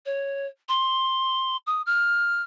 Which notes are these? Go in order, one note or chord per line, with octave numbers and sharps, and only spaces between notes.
C#5
C6
D#6
F6